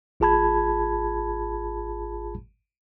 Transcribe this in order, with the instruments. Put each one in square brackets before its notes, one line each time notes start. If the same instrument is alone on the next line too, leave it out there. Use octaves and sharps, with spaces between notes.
[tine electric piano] G#1 F4 G#4 A5 B5 G#6